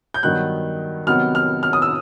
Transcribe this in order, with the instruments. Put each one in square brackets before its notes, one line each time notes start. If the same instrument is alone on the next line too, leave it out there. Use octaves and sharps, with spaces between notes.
[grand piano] G6
G2 D#3 F#3 B3 F#6
C3 D#3 F#3 B3 F6
F6
F6
D#6
E6